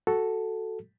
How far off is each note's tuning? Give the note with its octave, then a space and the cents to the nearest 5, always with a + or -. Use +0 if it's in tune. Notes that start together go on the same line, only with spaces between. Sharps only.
F#4 +5 A4 +0